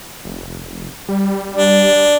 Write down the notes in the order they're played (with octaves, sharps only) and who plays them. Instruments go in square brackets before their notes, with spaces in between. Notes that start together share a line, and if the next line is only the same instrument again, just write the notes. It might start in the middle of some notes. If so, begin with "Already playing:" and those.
[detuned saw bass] F1
G3
[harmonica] D4